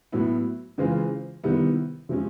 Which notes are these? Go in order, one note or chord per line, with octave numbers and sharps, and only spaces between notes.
A2 F#3 B3 E4
C#3 E3 G#3 C4 F4
C3 D#3 G3 B3 E4
C3 F3 G#3 C#4